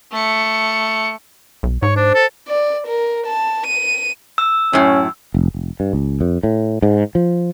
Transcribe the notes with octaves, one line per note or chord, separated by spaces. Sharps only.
A3 C#7
B1
G#2 C#5
D4 C5
A4
D5
A#4
A5
D#7
E6
F#2 A2 C#4
F1
F1
G2
C#2
F2
A2
G#2
F3